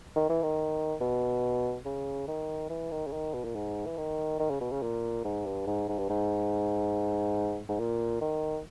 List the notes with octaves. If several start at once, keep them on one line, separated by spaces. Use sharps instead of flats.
D#3
E3
D#3
B2
C#3
D#3
E3
D#3
C#3
D#3
B2
A#2
G#2
E3
D#3
D#3
C#3
B2
C#3
A#2
G#2
G2
G#2
G#2
G2
G#2
G#2
A#2
D#3